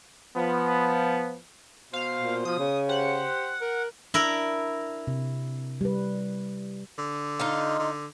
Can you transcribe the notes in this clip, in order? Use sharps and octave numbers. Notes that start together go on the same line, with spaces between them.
F3 B3
B2 C5 F5
A#2
F3 D#6
C#3
G4 C5 F#5
A#4
D4 E4 A#4
C3
G3 B4
D3
D#4 F4
D3